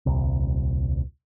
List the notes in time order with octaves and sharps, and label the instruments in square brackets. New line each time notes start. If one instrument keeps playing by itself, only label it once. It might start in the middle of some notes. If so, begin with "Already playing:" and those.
[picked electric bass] D#1 C2